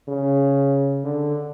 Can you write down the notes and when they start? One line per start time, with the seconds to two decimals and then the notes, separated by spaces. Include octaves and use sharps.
0.08 C#3
1.04 D3